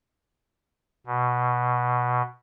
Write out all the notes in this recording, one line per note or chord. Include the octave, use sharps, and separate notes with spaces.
B2